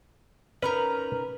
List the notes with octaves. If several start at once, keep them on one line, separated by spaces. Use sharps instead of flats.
C#4 D#4 A#4 B4